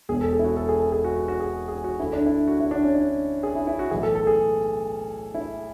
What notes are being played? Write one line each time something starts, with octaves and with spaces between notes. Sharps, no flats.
E1 E2 B2 G#4
A4
G#4
E4
F#4
A4
G#4
A4
G#4
F#4
F#4
F#4
G#4
G#4
F#4
D2 D3 E4
D4
E4
F#4
E4
D4
C#4
D4
G#4
E4
E4
F#4
B1 A2 E3 G#4
A4
A4
G#4
E4